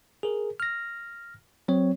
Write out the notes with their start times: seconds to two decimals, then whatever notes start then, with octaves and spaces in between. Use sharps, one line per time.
0.23 G#4 A#4
0.60 F6 A#6
1.68 F#3 C4 C#5